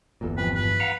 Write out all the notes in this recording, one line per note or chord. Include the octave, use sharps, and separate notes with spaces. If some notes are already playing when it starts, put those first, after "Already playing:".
G1 E2 A#2 A4 G#5
E3 F3 C4 D4 B4
G2 B4
F5 F#5 A#5